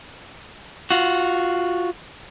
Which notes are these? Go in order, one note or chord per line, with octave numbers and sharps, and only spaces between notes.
F4 F#4